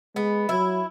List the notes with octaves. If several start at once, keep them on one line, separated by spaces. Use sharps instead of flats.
G#3 B3
F#3 E4